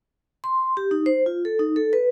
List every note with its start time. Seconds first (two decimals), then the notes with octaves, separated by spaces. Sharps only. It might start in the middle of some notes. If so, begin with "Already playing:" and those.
0.44 C6
0.77 G4
0.91 D#4
1.06 C5
1.26 F4
1.45 A4
1.59 D#4
1.76 A4
1.93 B4